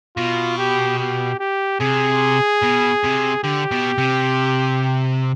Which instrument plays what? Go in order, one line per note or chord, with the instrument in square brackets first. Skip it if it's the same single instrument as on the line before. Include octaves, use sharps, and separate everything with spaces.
[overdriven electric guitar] B2 [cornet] F4
[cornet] G4
G4
G4
[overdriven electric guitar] C3 [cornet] G#4
[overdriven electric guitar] B2
C3
[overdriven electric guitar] D3 [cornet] G4
[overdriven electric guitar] B2
C3